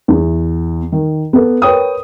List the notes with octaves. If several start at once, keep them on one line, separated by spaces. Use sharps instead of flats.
E2
D#3
B3 A4
A#4 B4 C#5 G5 D#6